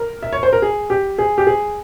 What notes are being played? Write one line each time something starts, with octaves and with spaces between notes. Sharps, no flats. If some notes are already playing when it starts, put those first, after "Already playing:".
Already playing: A#4
E5
C#5
C5
A#4
G#4
G4
G#4
G4
G#4